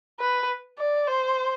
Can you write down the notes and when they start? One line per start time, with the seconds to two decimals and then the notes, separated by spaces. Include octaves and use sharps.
0.20 B4
0.78 D5
1.07 C5